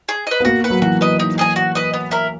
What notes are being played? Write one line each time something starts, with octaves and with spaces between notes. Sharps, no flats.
G#4
B4 D#5
B3
A#3 F#4
B4 F#5
F#3
E3 F#4
B4 D#5
D#4
G#4 D#5 G#5
F#4
B4 D#5
B3
E4 A#4